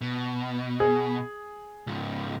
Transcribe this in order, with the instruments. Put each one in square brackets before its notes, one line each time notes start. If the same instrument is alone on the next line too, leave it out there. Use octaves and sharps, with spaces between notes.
[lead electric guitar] B2
[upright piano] G#4
[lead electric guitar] C#2 G#2